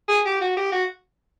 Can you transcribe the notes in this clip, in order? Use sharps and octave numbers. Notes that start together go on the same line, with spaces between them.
G#4
G4
F#4
G4
F#4